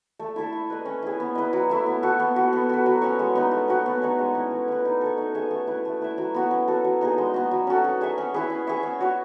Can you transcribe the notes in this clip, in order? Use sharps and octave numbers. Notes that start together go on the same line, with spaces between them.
A3
E4 A4 E5
E4
B4 D#5
C#4
E4 G#4
B3
E4 B4 D#5
F#3
A3 E4
B3
F#4 A4
B3
F#4 B4
B3
F#4 B4
F#3
C#4 F#4 C#5
G#3
B3 D#4
A3
C#4 F#4 B4
B3
D#4 A4 C#5
G#3
C#4 E4
A3
E4 B4
D#4
A4 C#5
D#4
G#4 C#5 E5
A3
E4 B4
A3
E4 B4 E5
F#3
B3 F#4 B4
C#4
F#4 A4
F#3
B3 D#4 G#4
G#3
B3 F#4
F#3
C#4 F#4 A4
C#4
G#4 C#5 E5
C#4
E4 G#4 B4
C#4
G#4 C#5 E5
C#4
F#4 C#5